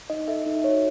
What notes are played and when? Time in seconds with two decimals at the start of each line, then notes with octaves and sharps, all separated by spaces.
0.10 D#4 D#5
0.28 A4 E5
0.46 D#4
0.64 F#4 A4 C#5